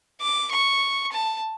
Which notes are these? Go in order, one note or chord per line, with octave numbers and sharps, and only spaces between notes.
D6
C#6
A5